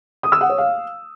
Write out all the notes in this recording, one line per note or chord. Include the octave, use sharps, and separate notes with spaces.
D#6
E6
F#5
C#5
F5